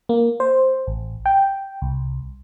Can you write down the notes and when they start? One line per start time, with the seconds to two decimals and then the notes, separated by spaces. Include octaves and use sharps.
0.09 A#3
0.40 C5
0.87 A1
1.26 G5
1.82 C2